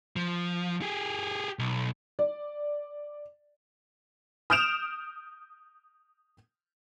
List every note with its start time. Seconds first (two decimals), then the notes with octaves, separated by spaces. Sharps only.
0.16 F3
0.82 G4 G#4
1.59 B1
2.19 D5
4.50 D#6 F6 G6 D7 E7 F7